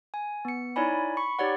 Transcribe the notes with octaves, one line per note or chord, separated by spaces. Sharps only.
G#5
B3 C#7
D#4 E4 C#5 D5 G#5 B5
B5 C#6 C#7
D#4 G4 C#5 D5 F#5